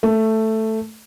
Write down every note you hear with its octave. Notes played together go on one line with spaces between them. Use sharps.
A3